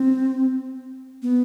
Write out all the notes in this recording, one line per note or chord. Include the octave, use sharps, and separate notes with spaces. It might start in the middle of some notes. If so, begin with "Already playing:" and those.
Already playing: C4
B3